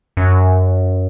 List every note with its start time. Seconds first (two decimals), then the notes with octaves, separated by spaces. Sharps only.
0.17 F#2